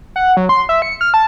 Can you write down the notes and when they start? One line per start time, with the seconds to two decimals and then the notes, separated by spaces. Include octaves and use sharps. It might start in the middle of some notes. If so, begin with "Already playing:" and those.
0.16 F#5
0.37 F#3
0.49 C6
0.69 E5
0.82 C#7
1.01 F6
1.14 A5